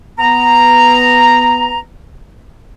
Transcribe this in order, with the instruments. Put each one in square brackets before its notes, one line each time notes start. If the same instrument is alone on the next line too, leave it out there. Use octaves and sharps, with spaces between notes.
[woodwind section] B3 A#5